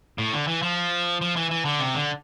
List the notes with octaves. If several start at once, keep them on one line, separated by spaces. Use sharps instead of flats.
A2
D3
E3
F3
F3
E3
E3
D3
C3
D3